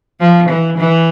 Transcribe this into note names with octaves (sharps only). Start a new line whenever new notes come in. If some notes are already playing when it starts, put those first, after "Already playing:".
F3
E3
E3